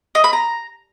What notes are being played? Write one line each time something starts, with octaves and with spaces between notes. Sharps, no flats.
D#5
B5
A#5